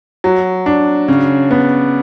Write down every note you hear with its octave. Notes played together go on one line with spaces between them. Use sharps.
F#3
D4
C#3
B3